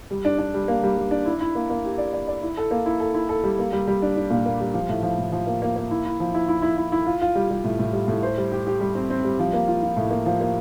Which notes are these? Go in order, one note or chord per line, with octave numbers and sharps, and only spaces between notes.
G3
D4
D4
G3
A#3
G3
G3
D4
E4
E4
A#3
A#3
G4
D5
D5
D5
E4
A4
A#3
E4
A4
E4
A4
G3
A#3
G3
G3
D4
D4
A#2
A#3
G3
F3
A2
F3
A2
F3
A#3
A#3
A#3
E4
E4
F3
E4
E4
E4
E4
E4
F4
F4
G3
G3
A2
A2
G3
A2
C5
G3
G4
G4
G3
C4
C4
G3
F3
A#3
F4
F4
A2
A#3
F3
A#3